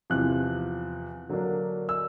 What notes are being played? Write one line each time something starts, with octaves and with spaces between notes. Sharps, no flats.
E2 C3 F3 F#6
D3 F#3 A#3 D4
E6